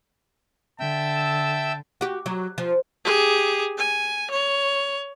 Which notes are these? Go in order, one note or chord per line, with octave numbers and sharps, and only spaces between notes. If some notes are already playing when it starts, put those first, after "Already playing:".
D3 E5 G5 A5 E6
F#4 G4
F#3
F3
G4 G#4
G#5
C#5